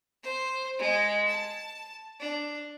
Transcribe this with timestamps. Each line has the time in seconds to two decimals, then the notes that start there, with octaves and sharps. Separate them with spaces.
0.23 C5
0.79 G#3
1.28 A5
2.20 D4